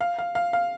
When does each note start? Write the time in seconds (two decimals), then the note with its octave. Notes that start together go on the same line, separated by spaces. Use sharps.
0.01 F5
0.18 F5
0.35 F5
0.53 F5